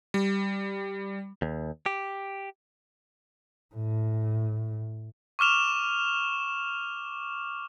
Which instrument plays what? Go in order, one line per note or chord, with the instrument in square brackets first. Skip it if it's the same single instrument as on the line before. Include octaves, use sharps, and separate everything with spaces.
[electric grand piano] G3
[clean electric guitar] D#2
G4
[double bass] A2
[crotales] C#6 D6 F6 E7 F7